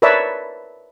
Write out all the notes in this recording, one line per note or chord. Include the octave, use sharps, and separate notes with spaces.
A#4 B4 C#5 D5 E5 A5